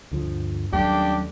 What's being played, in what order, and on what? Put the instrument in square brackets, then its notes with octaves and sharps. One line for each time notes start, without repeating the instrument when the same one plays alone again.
[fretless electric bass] D2 D3 F3 [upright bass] G2
[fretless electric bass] D#2 G3 A3 [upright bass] F#3 C#4 [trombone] D4 [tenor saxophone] G4